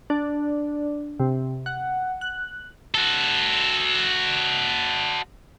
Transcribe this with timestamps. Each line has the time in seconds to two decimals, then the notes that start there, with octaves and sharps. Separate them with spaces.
0.10 D4
1.20 C3
1.66 F#5
2.21 F#6
2.95 F#4 A4